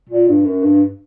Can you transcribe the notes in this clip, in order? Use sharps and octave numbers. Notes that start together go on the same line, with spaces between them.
A#2
G2
F#2
G2